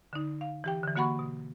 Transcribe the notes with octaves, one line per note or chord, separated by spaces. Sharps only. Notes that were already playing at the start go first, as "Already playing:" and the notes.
D3 D#4
F5
E3 G4 G5
D3 E3
D3 A#3 F#4 F#5 B5 C#6
B2